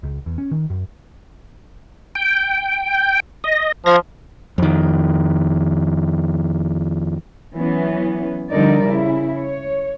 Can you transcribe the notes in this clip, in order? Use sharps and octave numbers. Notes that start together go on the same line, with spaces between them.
C#2
E2
C#4
D#3
F#2
G5
D#5
F3 F5 G#6 A#6
F2 D#3
E3 F#3 B3 C#4
D3 F3 G3 D#4 A#4 D5
C#3 E4
C#5